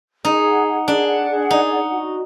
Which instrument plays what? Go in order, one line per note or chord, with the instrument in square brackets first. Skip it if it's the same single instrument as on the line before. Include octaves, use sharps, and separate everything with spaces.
[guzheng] D#4 [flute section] G#4
[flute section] F#5
F#5
[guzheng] D4 [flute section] G#4
[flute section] F#5
G#4
[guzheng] D#4 [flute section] D5
[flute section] F#5
F#4